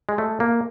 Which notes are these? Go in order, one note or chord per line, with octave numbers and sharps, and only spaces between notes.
G#3
A3
A#3